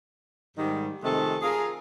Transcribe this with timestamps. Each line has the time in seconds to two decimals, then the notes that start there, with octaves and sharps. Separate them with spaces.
0.57 G#2 D#3 G3
1.03 F2 C3 D#3 G#3 A3 A4
1.42 F4 G#4 A#4